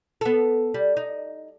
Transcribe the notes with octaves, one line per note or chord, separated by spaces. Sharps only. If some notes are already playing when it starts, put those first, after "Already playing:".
B3 A4
G3
D#4